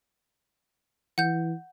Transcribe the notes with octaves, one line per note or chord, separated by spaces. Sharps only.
E3 F#5 G6